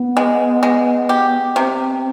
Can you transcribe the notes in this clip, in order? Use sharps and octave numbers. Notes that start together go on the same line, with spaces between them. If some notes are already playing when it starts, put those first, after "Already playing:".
Already playing: B3
G#3
G#3
G4
C3 C4